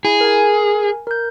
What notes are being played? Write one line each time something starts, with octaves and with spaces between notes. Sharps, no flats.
E4 G#4
A#4 G#5
A#4 G6